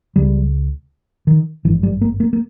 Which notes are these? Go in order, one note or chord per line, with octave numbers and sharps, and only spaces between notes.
C#2 C#3 G3
D#3
G#1 G2 E3
G3
A#3
A#3
A#3